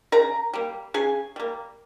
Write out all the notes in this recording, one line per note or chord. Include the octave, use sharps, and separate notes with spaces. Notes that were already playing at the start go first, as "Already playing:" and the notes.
C#3 A#4 A#5
G3 A#3
C#3 G#4 G#5
G3 A#3